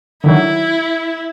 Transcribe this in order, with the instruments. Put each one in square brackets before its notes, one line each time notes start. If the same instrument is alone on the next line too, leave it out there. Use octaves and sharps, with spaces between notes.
[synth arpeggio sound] D3 D#3 F#3 [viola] E4